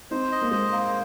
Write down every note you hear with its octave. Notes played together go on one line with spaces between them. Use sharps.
C4 D#4 C5
D#5
A#3
G#3 C5
A#3